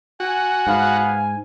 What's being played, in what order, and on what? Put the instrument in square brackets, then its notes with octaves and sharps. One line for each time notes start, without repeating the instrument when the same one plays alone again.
[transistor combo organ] F#4 [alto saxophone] G#5
[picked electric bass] G#2 [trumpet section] B3 F5